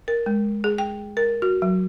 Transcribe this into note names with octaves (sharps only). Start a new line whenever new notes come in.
A#4
G#3
G#4
G5
A#4
F#4
F#3